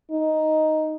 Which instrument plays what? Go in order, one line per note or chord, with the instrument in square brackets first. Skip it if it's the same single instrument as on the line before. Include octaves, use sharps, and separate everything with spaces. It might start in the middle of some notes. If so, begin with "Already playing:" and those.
[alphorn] D#4